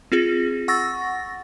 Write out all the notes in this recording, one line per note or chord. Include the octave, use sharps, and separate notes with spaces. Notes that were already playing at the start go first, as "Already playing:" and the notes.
C4 F4 G#4
F#5 C#6 E6 A6 A#6